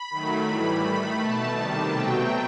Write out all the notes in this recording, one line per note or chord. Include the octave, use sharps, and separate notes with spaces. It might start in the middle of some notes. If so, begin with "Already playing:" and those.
Already playing: B5
D#3 F#3 A3
A2 E3 G3
D#3 A3 B5
B2 A3 A5
C3 D#3 G3
B2 F#3 A3 G5